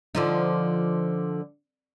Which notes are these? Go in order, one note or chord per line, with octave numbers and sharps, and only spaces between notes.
D3 F3 D#4